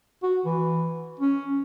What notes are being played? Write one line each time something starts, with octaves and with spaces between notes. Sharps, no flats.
F#4
E3
C#4